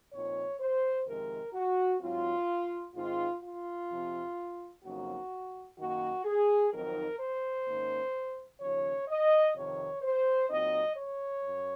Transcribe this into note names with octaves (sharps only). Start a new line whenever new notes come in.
A#2 F3 C4 D#4 C#5
C5
F2 C3 D#3 G#3 C4 A#4
F#4
G#2 F#3 C4 F4
G#2 D#3 G#3 C4 F4
F4
F2 C3 F3 C4
F2 C#3 F#3 A#3 D#4 F#4
F#2 D#3 A#3 F#4
G#4
F2 D#3 F#3 C4 D#4 A#4
C5
G#2 D#3 A#3 C#4
D#2 C#3 F3 C#5
D#5
F2 C3 D#3 C#5
C5
A#2 F#3 C4 D#4 D#5
C#5
F#2